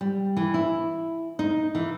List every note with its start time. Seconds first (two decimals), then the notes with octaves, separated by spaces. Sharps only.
0.01 G3
0.37 E3
0.54 E4
1.39 D#4
1.75 E3